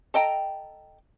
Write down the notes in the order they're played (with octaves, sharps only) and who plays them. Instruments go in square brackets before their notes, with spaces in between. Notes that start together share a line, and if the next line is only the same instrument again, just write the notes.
[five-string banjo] A4 D#5 G5 A#5